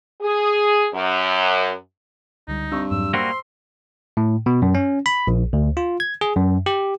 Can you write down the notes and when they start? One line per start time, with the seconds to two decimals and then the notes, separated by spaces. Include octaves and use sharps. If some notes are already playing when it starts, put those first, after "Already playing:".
0.21 G#4
0.94 F#2
2.48 C#2 D3 G3 D#4
2.72 G2 C4 C#6 E6
2.90 F2 G#2 F#3 E6
3.14 G3 A#3 F#4 C5 C6 E6
4.17 A2
4.46 B2
4.62 F#2
4.75 C#4
5.06 B5
5.27 A#1
5.53 D2
5.77 F4
6.00 G#6
6.21 G#4
6.36 F#2
6.66 G4